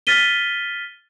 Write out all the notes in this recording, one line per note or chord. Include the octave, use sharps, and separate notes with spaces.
F6 A6 B6 D#7 G7